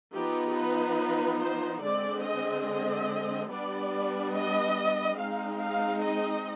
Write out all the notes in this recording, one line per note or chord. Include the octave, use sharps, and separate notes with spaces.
F3 B3 D#4 G4
B4
C5
D3 G#3 C4 D5
D#5
D#5
G3 B3 D4 D5
D#5
G#3 C4 D#4 F5
F5
D#5